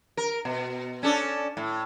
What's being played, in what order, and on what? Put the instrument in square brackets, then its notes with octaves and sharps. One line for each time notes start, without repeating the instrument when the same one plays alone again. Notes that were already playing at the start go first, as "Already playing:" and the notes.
[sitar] A#4
B2
C#4 D4 A4
A2